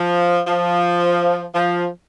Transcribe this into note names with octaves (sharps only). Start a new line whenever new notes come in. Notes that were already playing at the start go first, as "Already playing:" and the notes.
Already playing: F3
F3
F3